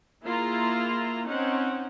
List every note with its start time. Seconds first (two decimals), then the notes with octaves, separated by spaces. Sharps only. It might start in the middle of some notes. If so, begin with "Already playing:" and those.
0.23 A#3 E4 F4 G#4 A#5
1.27 C4 C#4 D#4 F#5